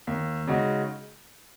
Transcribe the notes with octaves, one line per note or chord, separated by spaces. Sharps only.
D#2
C#3 G#3 D#4 F#4